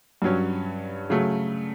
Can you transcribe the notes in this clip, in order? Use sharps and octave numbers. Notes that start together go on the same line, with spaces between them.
G2 F#3 C#4
C#3 F#3 A3